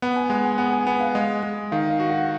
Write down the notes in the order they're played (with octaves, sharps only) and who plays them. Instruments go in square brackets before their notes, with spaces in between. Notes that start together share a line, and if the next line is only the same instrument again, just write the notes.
[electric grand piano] B3 [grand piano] F#5
[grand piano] G#5
[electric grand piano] G#3 [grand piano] F#5
[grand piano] G#5
[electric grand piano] B3 [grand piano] F#5
[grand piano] G#5
[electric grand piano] B3 [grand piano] F#5
[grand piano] F5
[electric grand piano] G#3 [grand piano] D#5
[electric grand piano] G#3
[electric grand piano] D#3 [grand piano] F5
[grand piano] F5
[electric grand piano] F#4
[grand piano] F#5